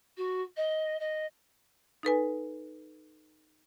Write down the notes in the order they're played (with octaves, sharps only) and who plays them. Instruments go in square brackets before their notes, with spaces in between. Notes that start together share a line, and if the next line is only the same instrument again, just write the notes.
[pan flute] F#4
D#5
D#5
[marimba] D#4 A4 B4 G#5